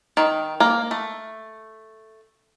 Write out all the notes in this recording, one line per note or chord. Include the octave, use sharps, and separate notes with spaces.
D#3
A#3
A3